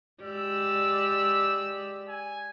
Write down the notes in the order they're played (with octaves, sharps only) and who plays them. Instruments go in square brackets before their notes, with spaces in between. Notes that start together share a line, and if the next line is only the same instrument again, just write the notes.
[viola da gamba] G#3 G4 D5 [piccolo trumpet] E6
[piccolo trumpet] G#5